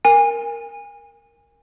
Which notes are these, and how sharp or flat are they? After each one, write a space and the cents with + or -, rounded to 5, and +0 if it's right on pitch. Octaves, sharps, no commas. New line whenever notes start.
A#4 +0 G#5 -25